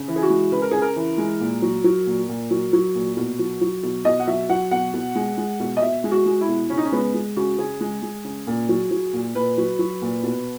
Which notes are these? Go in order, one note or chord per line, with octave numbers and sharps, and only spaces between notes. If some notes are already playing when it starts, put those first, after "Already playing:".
Already playing: C#3
E3
G#4
F#4
G#3
C#3 B4
A#4
C#3 G#4
A#4
E3
G#3
A#2
F#3
F#3
A#2
A#2
F#3
F#3
A#2
B2
F#3
F#3
B2
B2 D#5
F#5
F#3 E5
F#3 F#5
B2 F#5
B2
G#3
G#3
B2
D#5
B2 E5
G#3
F#4
G#3
E4
B2
C#3 C#4
D#4
C#4
G#3 B3
G#3
C#3 F#4
C#3 G#4
G#3
G#3
C#3
A#2
F#3
F#3
A#2
A#2 B4
F#3
F#3
A#2
B2